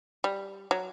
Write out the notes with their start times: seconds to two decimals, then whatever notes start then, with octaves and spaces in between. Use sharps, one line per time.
0.24 G3
0.71 F#3